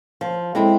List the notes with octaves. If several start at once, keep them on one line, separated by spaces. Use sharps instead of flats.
F3
G#3 C4 E4 A4